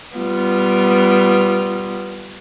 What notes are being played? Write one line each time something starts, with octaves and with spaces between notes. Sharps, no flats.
G3 B3 F4